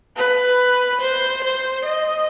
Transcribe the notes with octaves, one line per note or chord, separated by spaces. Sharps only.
B4
C5
C5
D#5